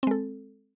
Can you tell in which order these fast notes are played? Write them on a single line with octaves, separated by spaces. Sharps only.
C4 G#3 A4